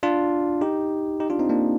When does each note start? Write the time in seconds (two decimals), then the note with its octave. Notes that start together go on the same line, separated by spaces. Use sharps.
0.03 D4 F4
0.61 D#4 G4
1.20 D#4 G4
1.30 D4 F4
1.39 C4 D#4
1.49 A#3 D4